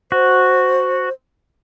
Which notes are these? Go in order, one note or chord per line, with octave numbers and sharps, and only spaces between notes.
F#4 C5